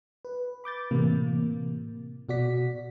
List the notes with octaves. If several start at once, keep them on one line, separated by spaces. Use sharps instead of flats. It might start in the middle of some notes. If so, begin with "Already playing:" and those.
B4
B5 D6 G6 A6
A2 C3 E3 A#3
B2 F#4 D5 B6